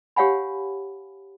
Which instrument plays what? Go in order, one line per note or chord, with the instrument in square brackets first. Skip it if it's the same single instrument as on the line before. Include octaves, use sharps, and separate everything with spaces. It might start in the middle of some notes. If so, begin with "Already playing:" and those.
[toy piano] G4 C#5 F5 F#5 G#5 B5